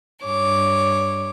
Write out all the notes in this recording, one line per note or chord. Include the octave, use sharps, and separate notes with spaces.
G2 C#5 D6